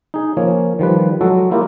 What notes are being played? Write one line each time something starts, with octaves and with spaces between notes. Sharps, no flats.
D#4 G#4
F3 A#3 C#4 C#5
D#3 F3 G3 B4
F#3 G#3 F#4 A4
A#3 E4 F4 G4 A#4